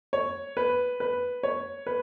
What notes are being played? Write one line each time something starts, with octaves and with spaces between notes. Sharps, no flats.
C#5
B4
B4
C#5
B4